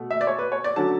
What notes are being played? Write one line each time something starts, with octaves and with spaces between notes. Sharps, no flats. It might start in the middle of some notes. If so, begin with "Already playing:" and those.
Already playing: B2 A3
E5
D5
C#5
B4
C#5
D5
D3 F#3 A3 C#4 A5